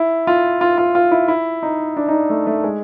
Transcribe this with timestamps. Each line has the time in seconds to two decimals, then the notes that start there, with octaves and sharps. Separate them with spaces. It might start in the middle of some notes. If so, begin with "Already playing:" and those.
Already playing: E4
0.27 F4
0.61 F4
0.78 F4
0.95 F4
1.11 E4
1.28 E4
1.63 D#4
1.97 D4
2.08 D#4
2.13 D4
2.30 A3
2.47 A3
2.64 G#3